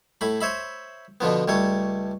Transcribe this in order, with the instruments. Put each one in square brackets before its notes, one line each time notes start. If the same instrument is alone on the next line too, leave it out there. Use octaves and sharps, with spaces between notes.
[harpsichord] A2 A3 B5
C5 C#5 E5 B5
B2 D3 F3 B3
C#2 G3 A3 C#5